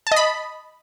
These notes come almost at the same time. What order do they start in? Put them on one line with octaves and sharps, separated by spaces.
A5 D#5 B5